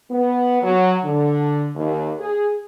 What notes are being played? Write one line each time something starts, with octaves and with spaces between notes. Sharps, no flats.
B3
F#3
D3
D#2
G#4